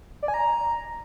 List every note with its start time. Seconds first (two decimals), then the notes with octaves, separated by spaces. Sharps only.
0.23 D5
0.28 G#5
0.34 A#5